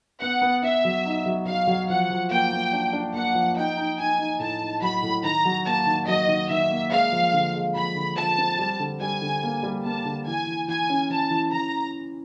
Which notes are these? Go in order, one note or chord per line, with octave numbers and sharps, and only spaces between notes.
B3 F#5
B3
B3 E5
F#3
D#4
F#3
F#3 F5
F#3
F3 F#5
F3
A#3 G5
A#3
D4
D4
A#3 F#5
F3
D#4 G5
D#4
D#4 G#5
D#4
A2 A5
D#4
F#3 B5
A2
D#3 A#5
F#3
A#3 A5
D#3
F#3 D#5
D#3
D#3 E5
A#3
G#3 F5
F3
D3
G#3
F3 B5
D3
F3 A5
C4
G3
D3
G3 G#5
D3
A#3
G3
A#3 A5
D3
E3 G#5
E3
E3 G#5
C#4
E3 A5
E3
E3 A#5